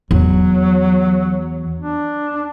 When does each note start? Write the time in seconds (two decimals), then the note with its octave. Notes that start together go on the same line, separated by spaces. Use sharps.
0.11 E2 F#3
1.80 D4